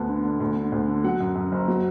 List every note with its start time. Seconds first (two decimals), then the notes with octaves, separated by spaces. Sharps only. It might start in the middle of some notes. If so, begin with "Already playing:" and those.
Already playing: D2 B3 A5
0.09 D3
0.25 D3
0.40 D2
0.57 D3
0.72 D2
0.88 D3
1.04 F#3 F#5
1.20 F#2
1.36 F#2
1.52 F#1
1.68 F#3